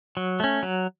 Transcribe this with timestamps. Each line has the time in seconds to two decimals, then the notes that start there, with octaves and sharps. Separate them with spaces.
0.17 F#3
0.40 A3 C#4
0.63 F#3